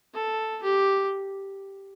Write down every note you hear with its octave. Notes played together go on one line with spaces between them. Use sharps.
A4
G4